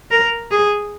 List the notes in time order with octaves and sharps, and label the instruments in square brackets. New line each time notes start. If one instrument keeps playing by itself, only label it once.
[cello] A#4
G#4